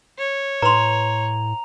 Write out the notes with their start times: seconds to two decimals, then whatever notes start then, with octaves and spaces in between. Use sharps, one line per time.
0.18 C#5
0.62 A2 B4 A#5 C6 F7